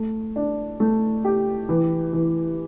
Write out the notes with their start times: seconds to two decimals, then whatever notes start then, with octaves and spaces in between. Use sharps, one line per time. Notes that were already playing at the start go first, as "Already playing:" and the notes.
Already playing: A3
0.36 D4
0.80 A3
1.24 G4
1.69 E3
2.13 E3